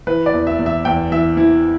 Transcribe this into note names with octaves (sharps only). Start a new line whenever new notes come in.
E3 B4
D5
E2
E5
E2
E5
E2 G5
E3 E5
E3 E4